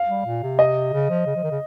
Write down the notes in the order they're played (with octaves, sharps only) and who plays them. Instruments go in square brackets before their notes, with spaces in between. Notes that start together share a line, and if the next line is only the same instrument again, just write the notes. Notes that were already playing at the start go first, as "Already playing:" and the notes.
Already playing: [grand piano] F5
[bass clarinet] G3
A#2
C3
[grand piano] D#5
[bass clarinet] C#3
F3
C#3
F3
D#3
C#3